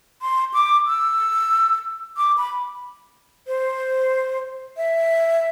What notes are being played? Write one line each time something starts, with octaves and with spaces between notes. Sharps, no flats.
C6
D6
E6
D6
B5
C5
E5